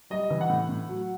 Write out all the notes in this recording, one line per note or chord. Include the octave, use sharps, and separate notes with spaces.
G3 D#5
E3
F#5
A2
A2
F#3